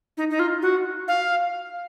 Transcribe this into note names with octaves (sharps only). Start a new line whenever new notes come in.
D#4
D#4
F4
F#4
F5